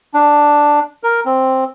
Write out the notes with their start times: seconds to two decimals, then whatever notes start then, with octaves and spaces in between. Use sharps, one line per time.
0.14 D4
1.04 A#4
1.26 C4